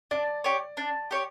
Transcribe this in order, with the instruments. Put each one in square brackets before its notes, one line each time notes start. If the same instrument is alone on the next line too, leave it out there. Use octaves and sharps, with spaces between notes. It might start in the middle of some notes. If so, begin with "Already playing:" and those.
[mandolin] D4 [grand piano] D5
[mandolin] G4 C#5
D4
G4 C#5